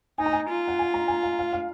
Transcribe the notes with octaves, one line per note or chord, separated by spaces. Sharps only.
D#4 G#5
A#5
G#5
F4
F#5
G#5
A#5
G#5
F5
F5
F5